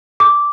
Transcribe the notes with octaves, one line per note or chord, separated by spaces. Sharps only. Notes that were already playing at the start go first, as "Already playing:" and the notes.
D6